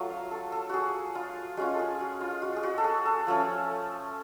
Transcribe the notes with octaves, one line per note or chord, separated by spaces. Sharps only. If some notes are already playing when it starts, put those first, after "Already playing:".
Already playing: F#3 A3 F4
F5
A4
A4
F#4 G#4
F4
G#3 C#4 F4 F#4
G#4 A4
F#4
F4
F#4
G#4
F#4
A4
G#4
A4
F3 A3 C#4